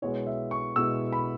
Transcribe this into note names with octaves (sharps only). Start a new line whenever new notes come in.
B2 G#3 B3 E4 C#5
E5
C#6
B2 G#3 B3 E4 E6
B5